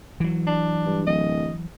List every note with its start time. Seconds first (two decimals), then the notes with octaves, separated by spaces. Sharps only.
0.20 E3 F#3
0.47 D4
0.86 G2
1.07 D1 D#5